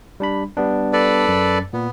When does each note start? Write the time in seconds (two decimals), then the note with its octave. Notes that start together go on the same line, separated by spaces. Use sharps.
0.20 G3 D4 B5
0.57 G3 B3 D4
0.93 A4 B4 D5
1.29 F#2
1.73 A#2 B3